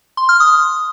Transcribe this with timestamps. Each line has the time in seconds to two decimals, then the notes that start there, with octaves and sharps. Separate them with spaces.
0.17 C6
0.29 F6
0.40 D#6